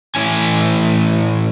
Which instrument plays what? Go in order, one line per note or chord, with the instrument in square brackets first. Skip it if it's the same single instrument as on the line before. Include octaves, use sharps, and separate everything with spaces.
[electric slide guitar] A2 E3 C#4 G#5